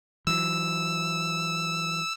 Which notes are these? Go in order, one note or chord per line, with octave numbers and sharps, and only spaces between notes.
E3 F#3 E6